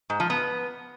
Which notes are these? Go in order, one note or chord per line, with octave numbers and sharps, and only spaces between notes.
G#2
F3
B3